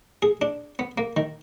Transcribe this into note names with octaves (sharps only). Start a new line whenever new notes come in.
G#4
D4
B3
A#3
D#3